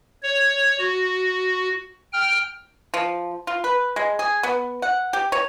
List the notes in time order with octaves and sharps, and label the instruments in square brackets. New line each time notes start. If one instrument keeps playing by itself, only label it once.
[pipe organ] C#5
F#4
G5 F6
[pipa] F3
F4
B4
G#3
G#4
B3
F#5
G4
C#5